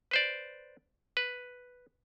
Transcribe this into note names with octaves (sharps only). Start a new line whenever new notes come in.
B4 C5 D5
B4